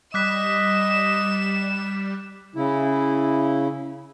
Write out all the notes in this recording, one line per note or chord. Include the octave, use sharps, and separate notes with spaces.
G3 D#5 D6 F#6 B6 E7
C#3 E4